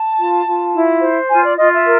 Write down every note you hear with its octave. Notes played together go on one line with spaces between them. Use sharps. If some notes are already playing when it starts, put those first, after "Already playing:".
Already playing: A5
F4
F4
E4
C5
F4 G#5
D5
F4 D#5
E5
A#4